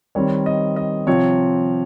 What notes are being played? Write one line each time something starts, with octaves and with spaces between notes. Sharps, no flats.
D#3 G3 C4 C#5
D#5
D#5
C3 F3 C4 C#5